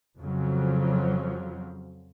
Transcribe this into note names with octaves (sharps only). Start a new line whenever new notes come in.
F2 C#3 F3 F#3